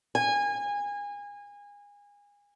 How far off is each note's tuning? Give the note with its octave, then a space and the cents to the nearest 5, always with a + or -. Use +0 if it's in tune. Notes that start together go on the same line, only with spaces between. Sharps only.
G#5 -25